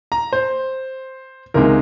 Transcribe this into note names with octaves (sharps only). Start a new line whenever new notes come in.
A#5
C5
C#2 C3 D#3 G#3 D#4 A#4